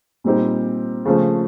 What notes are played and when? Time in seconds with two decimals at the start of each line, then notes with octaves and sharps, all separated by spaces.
0.24 A#2 G3 C4 D#4 G4
1.05 C#3 F3 A3